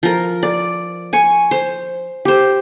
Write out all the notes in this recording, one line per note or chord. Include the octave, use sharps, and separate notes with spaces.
F3 A#4
D5
G#5 C#6
C5
G4 C5